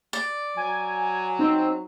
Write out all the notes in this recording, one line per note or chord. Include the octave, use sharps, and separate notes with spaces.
D5
F#3 G#5
C4 D#4